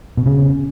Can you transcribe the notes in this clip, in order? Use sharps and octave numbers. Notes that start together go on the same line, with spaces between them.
B2
C#3